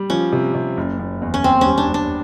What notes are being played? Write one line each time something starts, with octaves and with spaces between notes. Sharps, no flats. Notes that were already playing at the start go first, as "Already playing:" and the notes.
Already playing: G3
F3 C#4
C3
C3
F#1
F#1
E2
C#4
D#2 C4
G3 C#4
D4
G3 D4